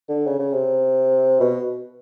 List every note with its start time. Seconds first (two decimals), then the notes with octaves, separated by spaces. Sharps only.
0.09 D3
0.27 C#3
0.39 C#3
0.53 C3
1.40 B2